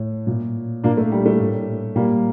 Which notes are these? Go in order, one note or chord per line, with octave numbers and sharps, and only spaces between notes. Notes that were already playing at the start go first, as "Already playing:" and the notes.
Already playing: A2
A#2
A#2 A#3 D4
A3
G3
A3
A2
A#2 G3 A#3